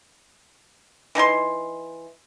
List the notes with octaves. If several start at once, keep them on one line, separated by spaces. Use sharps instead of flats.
E3 D#4 G#5 C6